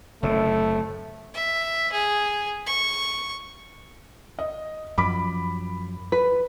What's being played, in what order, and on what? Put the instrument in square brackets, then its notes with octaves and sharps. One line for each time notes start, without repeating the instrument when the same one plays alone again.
[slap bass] F#1 A2 C3 [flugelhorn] A3
[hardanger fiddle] E5
G#4
C#6
[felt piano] D#5
[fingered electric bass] F#2 F3 [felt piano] B5 D6 B6
[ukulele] B4